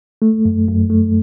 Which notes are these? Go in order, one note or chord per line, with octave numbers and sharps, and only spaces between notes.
A3
F#2
F#2
A3